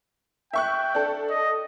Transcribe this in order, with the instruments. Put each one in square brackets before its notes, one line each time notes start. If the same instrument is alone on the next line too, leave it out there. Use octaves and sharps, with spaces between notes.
[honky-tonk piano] E5 C#6 F#6 [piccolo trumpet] G5
[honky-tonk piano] D4 A4
[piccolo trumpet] D#5